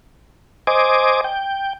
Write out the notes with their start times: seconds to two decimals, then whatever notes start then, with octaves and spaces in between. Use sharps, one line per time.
0.67 C5 D#5 G#5 D6
1.24 G5